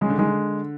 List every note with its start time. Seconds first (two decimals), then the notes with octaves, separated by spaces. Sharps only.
0.01 C#3 G#3
0.10 D3
0.18 D#3 G#3
0.27 D3